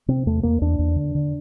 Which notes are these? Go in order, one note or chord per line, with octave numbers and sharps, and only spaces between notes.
C3 C4
E2 A3
E2 A#3
E2 D4
E2
D3
D3